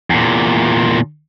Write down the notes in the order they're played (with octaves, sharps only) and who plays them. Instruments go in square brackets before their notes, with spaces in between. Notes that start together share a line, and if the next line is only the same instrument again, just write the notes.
[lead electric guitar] E2 A#2